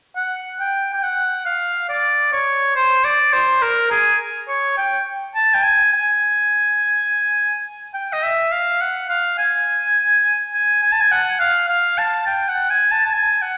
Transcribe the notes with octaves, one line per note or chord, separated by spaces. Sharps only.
F#5
G5
G5
F#5
F5
D5
C#5
C5
D5
C5
A#4
G#4
C#5
G5
A5
G5
G#5
G#5
G5
D#5
E5
F5
F#5
F5
G#5
G#5
G#5
A5
G#5
F#5
F5
F5
A5
G5
F#5
G#5
A5
A5
G#5
F#5